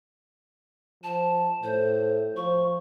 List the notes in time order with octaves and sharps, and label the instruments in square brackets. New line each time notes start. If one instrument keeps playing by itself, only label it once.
[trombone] F3 [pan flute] A5
[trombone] A2 [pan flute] C5
[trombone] F3 [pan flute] C#6